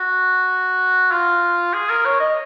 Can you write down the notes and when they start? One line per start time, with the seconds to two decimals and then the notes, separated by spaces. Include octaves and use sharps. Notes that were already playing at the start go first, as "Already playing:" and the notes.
Already playing: F#4
1.11 F4
1.74 G#4
1.90 A#4
2.05 C#5
2.20 D#5